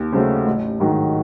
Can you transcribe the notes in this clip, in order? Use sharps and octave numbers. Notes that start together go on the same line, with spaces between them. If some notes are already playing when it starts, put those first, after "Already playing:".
Already playing: D#2
C#3 F#3 A3 C5
A1
G#2 D#3 F#3